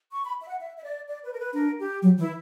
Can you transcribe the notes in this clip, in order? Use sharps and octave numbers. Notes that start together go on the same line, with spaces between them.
C#6
B5
E5
F#5
E5
E5
D5
D5
B4
A#4
B4
D4 A#4
G4
F#3
E3 E4